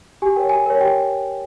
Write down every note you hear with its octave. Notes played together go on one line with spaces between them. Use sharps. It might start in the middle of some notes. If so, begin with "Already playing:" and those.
G4 G#5
A#4 C#5 G5
G4 G#5
A#4 C#5
G4 G5